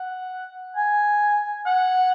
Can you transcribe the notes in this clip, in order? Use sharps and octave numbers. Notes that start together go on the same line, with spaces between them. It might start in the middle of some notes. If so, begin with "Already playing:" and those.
Already playing: F#5
G#5
F#5